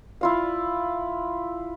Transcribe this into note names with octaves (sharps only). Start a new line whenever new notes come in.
E4 F4 F5